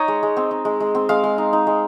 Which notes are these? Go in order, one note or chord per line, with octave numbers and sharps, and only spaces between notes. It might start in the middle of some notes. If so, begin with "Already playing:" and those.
Already playing: D#4 C#5 D#5
G#3
G#3
C4
D#4
G#3
G#3
C4
G#3 F5
G#3
D#4
D#4
G#3